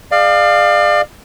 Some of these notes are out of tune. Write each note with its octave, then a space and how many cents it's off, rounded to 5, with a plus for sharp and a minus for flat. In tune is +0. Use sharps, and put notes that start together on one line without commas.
G#4 +0 D5 +35 F5 +0